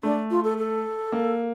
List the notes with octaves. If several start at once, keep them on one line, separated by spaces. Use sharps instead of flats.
A3 D4
F4
A4
A4
A#3